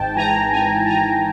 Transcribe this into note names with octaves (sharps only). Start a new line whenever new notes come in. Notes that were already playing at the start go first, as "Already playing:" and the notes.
Already playing: G#1 G#2 G5 A5
E3 G#5 A#5
G#1 G#5 A#5
A5
G#1 G#5 A#5